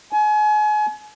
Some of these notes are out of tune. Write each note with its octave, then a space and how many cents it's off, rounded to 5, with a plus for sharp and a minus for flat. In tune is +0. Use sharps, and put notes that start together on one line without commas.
G#5 +35